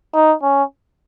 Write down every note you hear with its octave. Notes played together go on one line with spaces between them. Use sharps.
D#4
C#4